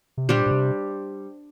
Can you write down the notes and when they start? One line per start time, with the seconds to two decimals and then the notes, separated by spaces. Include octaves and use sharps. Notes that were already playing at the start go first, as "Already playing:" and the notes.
0.17 C3
0.28 A#2 G3 D4 G4 C5
0.46 A#2
0.51 C3